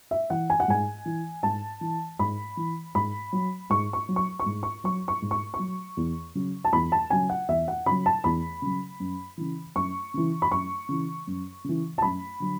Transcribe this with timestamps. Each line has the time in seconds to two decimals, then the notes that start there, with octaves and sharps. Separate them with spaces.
0.11 E5
0.30 E3 F#5
0.50 G#5
0.60 F#5
0.68 G#2 G#5
1.05 E3
1.43 G#2 A5
1.81 E3
2.19 G#2 B5
2.57 E3
2.95 G#2 B5
3.32 F#3
3.70 G#2 C#6
3.93 C#6
4.09 F#3
4.16 C#6
4.40 C#6
4.46 G#2
4.63 C#6
4.84 F#3 C#6
5.08 C#6
5.22 G#2
5.31 C#6
5.54 C#6
5.59 F#3
5.97 E2
6.35 C#3 F#3
6.65 A5
6.73 E2 B5
6.92 A5
7.10 C#3 F#3 G#5
7.29 F#5
7.48 E2 E5
7.68 F#5
7.86 C#3 F#3 B5
8.06 A5
8.24 E2 B5
8.62 C#3 F#3
9.00 F#2
9.37 C#3 E3
9.76 F#2 C#6
10.14 C#3 E3
10.42 B5
10.51 F#2 C#6
10.89 C#3 E3
11.27 F#2
11.64 C#3 E3
11.98 A5
12.02 F#2 B5
12.40 D3 F#3